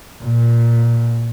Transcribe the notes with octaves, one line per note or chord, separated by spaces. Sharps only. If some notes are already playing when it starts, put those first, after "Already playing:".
A#2